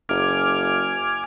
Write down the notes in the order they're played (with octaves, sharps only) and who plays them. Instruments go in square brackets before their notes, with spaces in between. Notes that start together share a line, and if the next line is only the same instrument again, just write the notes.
[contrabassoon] F#1 [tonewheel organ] G#5 D6 F6